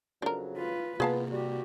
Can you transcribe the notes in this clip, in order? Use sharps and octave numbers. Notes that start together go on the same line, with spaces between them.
F2 C#3 F#3 D4 A#4
F4 B4
C3 A#3 B3 F4 G#4 F5 A5
G3 F#4 G4